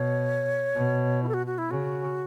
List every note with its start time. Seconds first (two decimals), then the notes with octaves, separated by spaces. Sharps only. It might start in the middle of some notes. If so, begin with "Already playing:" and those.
Already playing: B2 C#5
0.75 B2
1.23 E4
1.28 A4
1.34 F#4
1.46 F#4
1.58 E4
1.71 C#3 F#4